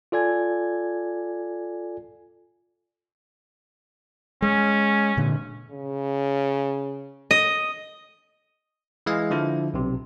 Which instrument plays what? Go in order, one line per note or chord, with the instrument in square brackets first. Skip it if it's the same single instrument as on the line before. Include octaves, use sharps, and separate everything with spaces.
[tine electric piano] F4 A4 D5 G#5 G#6
[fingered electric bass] G#3 [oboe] C#4
[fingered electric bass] A#2 D3
[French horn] C#3
[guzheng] D#5
[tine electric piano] E3 G#3 D#5 F5
D3 F3 E4
B1 C3